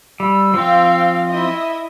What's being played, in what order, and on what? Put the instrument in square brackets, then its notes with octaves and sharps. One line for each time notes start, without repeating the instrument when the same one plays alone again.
[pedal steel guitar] G3 [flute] E6
[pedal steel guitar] F3 C4 [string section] F5 G5
[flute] E4 [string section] D#5 E5